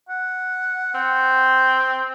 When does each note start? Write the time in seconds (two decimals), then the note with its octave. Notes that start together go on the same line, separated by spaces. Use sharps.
0.09 F#5
0.94 C4